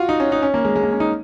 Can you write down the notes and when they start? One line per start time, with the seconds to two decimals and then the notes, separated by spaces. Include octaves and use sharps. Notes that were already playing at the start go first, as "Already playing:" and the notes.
Already playing: F4 F#4
0.09 D#4
0.20 C#4
0.32 D#4
0.43 C#4
0.54 A#3
0.65 G#3
0.76 G#3
0.83 A#3
0.92 C#4
1.00 D#4